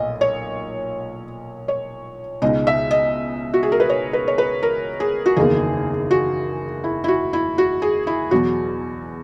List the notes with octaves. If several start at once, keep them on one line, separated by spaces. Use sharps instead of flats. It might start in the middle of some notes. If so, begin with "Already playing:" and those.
Already playing: B1 A#2 D#5
C#5
C#5
C#2 B2 G#3 D#4 D#5
E5
D#5
F#4
G#4
A#4
B4
C#5
B4
C#5
B4
A#4
G#4
F#4
F#1 E2 D#3 A#3 G#4
F#4
E4
E4
F#4
E4
F#4
G#4
E4
E2 B2 F#3 F#4